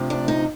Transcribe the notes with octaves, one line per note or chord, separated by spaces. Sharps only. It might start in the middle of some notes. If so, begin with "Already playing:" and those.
Already playing: D2 C3 F3
D4
D#4